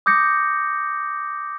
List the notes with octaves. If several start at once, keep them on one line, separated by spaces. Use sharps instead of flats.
D6 D#6 G6 A#6 C#7